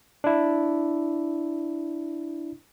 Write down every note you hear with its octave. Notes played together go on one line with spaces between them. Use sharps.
D4 E4